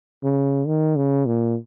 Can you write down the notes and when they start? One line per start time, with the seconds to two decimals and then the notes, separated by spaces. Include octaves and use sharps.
0.24 C#3
0.67 D#3
0.96 C#3
1.26 A#2